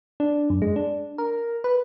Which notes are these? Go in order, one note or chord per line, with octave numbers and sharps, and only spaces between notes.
D4
F#2
G#3
D4
A#4
B4